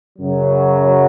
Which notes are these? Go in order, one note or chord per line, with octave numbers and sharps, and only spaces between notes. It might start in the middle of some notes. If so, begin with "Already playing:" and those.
F#2 C#3 F#3